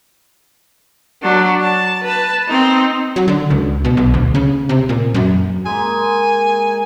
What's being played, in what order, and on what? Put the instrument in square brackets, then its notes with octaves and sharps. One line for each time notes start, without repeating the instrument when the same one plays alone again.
[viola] F#3 D4
A5
B4 A5
C4 D#4
[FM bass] F#3
D3
C#2
B2
B1
D2
C#3
C3
A#2
F#2
[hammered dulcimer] G#3 A#3 B5 [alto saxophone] G#5